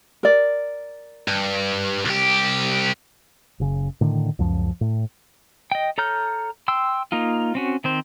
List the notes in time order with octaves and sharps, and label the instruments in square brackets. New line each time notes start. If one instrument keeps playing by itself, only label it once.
[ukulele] A#4 D5
[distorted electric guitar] G2
C2 G4
[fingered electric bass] F#1 C#3
A2 D3 D#3
C#2 F#2 F3
A2
[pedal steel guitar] D#5 G5
A4 C#5 A#5 F6 G6
G5 C6 E6
A#3 D#4 F4
C4 C#4 F#4
D#3 C4 C5